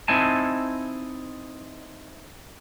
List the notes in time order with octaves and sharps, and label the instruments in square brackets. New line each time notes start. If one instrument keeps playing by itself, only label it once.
[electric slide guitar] C4 D#4 E4 G#5 A5